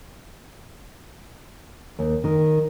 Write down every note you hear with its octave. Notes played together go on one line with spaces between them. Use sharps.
D#2
D#3